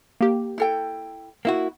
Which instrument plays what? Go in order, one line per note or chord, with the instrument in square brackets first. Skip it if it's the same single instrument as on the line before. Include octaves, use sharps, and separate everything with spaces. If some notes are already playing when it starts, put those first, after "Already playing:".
[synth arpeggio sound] A#3 G4
[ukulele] E4 A4 G5
[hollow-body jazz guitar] A#3 E4 F#4